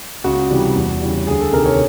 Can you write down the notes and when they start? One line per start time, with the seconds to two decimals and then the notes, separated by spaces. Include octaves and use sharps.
0.24 C#2 F#4
0.50 C3 E3 G3
0.75 E2
1.01 C#3 E3 G3
1.27 D2 G#4
1.41 A4
1.53 C3 D#3 A#4
1.66 C#5